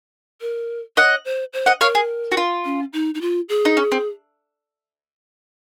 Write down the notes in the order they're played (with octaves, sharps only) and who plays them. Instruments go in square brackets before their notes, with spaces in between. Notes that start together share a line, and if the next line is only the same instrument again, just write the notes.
[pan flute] A#4
[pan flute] C#5 [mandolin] D#5 F#5
[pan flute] C5
C5
[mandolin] D#5 F#5
[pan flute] A#4 [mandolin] C#5 F5
[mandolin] G#4
F#4
F4
[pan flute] C#4
D#4
D#4
F4
G#4
[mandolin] D#4
C#4
C4